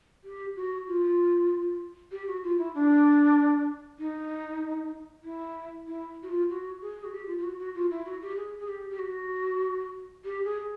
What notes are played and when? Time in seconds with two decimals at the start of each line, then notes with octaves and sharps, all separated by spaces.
0.24 G4
0.56 F#4
0.88 F4
2.12 G4
2.27 F#4
2.44 F4
2.58 E4
2.75 D4
3.99 D#4
5.24 E4
5.87 E4
6.23 F#4
6.29 F4
6.50 F#4
6.81 G#4
7.04 F#4
7.12 G4
7.27 F4
7.38 F4
7.43 F#4
7.59 F#4
7.75 F4
7.91 E4
8.06 F#4
8.22 G4
8.36 G#4
8.59 G#4
8.68 G4
8.90 G4
8.99 F#4
10.25 G4
10.45 G#4